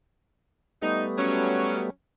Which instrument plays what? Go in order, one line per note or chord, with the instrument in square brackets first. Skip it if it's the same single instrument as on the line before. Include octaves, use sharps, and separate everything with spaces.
[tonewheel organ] G3 A3 B3 [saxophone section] D#4
[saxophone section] F#3 C#4